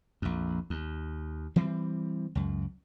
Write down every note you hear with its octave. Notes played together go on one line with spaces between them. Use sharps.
A#1 F2
D#2
E3 G3 C4
C#2 F#2